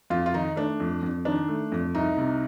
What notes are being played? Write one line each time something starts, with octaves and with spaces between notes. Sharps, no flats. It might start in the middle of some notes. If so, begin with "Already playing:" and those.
F2 F4
F4
D#3 D#4
A3 D4
F2
F2
D#3 D4
A3
F2
C2 D#4
C3